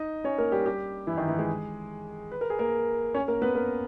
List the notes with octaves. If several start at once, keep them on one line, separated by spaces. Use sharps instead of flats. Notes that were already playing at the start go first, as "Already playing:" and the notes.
Already playing: D#4 D#5
C#4 C#5
A#3 A#4
G3 G4
G3 G4
E3 E4
D#3 D#4
E3 E4
G#3 G#4
B4
A#4
G#4
A#3 A#4
C#4 C#5
A#3 A#4
B3 B4
A#3 A#4